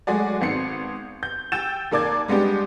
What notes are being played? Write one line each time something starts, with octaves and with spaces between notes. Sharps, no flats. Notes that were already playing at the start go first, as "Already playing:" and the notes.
F#3 G#3 A3 F#4 G#4 D5
G#1 B3 C4 C7 C#7
G6
G5 E6 G6 A6 E7
D#2 A#3 D5 D6 G#6
G3 G#3 B3 D4 G4